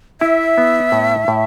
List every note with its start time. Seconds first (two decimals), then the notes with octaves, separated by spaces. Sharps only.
0.21 E4 E5
0.58 B3
0.92 A2
1.28 A2